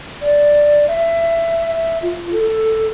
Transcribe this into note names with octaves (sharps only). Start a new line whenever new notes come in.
D5
E5
F4
A4